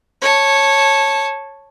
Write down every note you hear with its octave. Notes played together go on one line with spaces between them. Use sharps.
C#5 A5